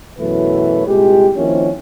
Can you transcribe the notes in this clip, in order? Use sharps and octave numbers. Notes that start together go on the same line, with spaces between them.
F#2 B2 E3 F#3 A3 B4
C2 A#2 G#3 G4
D#3 F3 A#3 C4 C#4 E4